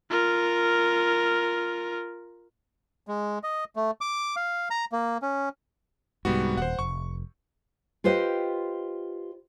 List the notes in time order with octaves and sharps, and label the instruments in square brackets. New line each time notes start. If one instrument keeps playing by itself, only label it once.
[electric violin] F4 A#4
[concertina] G#3
D#5
A3
D6
F5
A#5
A#3
C#4
[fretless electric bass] C2 G#2 [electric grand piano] G3 B3 F#4
[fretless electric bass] D#1 [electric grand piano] C5 F#5
[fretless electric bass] F1 [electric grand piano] C#6
[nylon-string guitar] F4 G4 B4 C5 D#5 G5